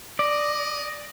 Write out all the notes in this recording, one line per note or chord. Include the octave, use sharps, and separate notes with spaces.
D5 D#5